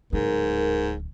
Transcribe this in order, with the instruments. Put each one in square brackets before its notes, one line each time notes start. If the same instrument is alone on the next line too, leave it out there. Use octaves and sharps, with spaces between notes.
[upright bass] D1 D3 [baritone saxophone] G#2 [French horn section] A#4